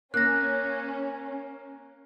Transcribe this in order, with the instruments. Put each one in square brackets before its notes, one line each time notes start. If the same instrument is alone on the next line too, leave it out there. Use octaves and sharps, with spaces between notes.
[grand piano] A#3 [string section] C#4 [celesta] F#6 A#6